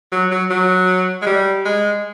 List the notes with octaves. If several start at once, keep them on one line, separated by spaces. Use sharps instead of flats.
F#3
F#3
F#3
G#3
G3
G#3